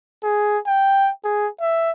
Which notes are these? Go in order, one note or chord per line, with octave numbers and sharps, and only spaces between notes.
G#4
G5
G#4
E5